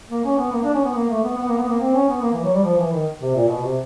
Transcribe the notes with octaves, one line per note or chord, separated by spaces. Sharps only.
A#3
C#4
B3
A#3
D4
C#4
B3
A#3
A3
B3
B3
A#3
B3
A#3
C4
C#4
B3
A#3
E3
F#3
G3
F3
E3
D#3
C3
A#2
B2
C3